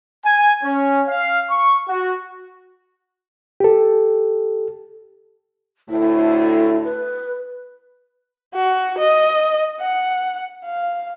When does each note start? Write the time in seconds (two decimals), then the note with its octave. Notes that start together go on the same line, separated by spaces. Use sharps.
0.24 G#5
0.63 C#4
1.08 F5
1.50 C#6
1.88 F#4
3.60 G4 A4
5.90 D2 A2 A3 E4
6.85 B4
8.54 F#4
8.98 D#5
9.80 F#5
10.65 F5